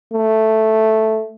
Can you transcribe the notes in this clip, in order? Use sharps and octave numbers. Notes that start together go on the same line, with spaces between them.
A3